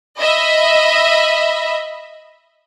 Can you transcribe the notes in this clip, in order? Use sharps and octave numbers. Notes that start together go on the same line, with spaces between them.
D#5 E5 B5